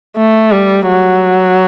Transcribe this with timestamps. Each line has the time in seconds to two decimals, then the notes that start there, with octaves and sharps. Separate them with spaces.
0.17 A3
0.52 G3
0.88 F#3